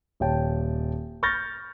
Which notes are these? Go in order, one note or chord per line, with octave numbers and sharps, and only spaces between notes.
D#1 C#5 G5 A5
C#6 F6 G6 A6 A#6